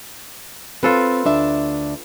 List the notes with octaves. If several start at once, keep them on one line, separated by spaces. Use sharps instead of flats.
C4 F4 A4 B4
D2 D4 E5